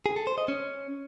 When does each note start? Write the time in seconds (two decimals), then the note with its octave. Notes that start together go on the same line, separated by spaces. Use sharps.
0.06 G#4
0.16 A4
0.27 C5
0.38 D#5
0.48 C#4